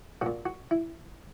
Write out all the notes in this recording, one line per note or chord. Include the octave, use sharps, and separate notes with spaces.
A#1 A#2 F#4
F#4
E4